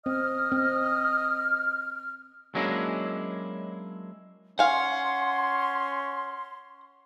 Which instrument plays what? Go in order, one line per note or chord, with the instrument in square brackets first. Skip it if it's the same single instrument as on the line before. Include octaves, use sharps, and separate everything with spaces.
[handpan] C4 [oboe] D#5 [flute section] F6
[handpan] C4
[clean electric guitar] F#3 G#3 A#3 C#4 D4 E4
[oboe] C#4 [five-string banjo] F5 G#5 [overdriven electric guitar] F#5 [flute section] C6